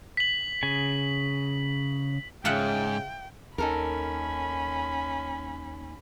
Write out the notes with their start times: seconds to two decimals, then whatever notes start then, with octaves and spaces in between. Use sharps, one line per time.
0.17 B6 F#7
0.63 C#3 G#5
2.45 G#2 C#3 F4 E5 F#5 G5
3.58 D#2 C#4 D#4 A4 A#4 B5